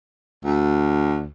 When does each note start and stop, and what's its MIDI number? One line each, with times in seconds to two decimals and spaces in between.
0.45 1.27 38